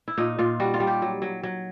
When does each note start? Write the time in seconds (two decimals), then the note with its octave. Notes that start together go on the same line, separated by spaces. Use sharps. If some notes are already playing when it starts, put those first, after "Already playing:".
0.08 E4
0.18 A#2 D#4
0.39 A#2 F4
0.60 G3 F#4
0.74 F4
0.80 G3
0.87 G4
1.02 F#3
1.22 F#3
1.43 F#3